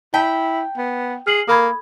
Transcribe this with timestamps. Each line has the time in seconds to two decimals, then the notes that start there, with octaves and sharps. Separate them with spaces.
0.14 E4 G5 A5 B6
0.77 B3
1.27 G#4 F6 C7 F#7
1.48 A#3 A4 B5 G#6